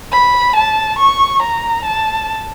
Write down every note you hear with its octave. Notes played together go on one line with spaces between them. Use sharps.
B5
A5
C#6
A#5
A5